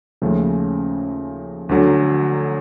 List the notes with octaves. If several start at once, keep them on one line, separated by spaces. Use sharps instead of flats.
D#2 C#3 F3 A3 C#4
D2 D3 F#3